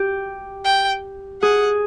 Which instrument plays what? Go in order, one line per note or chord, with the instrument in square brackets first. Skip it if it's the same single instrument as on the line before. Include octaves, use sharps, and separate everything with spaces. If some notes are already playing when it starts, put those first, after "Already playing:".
Already playing: [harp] G4
[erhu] G5
[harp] G#4 [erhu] F#5